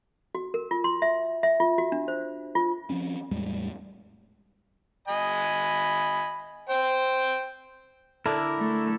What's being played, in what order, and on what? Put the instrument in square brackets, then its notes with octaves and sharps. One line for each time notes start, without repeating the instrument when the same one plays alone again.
[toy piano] F#4
A#4
F4
C6
E5
E5
F4
F#4
D4
C5
F4
[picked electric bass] F3 C4 C#4
E2 A2 G3 G#3
[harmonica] D#5 G#5 B5
C5 G5
[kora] D3 D4 [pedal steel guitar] E4 A#4
[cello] A3